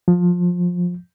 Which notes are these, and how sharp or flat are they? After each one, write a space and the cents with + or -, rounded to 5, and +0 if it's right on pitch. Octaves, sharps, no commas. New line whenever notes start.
F3 +20